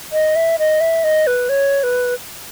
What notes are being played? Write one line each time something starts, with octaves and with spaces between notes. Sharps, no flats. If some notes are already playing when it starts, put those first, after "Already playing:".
D#5
E5
D#5
E5
D#5
B4
C#5
B4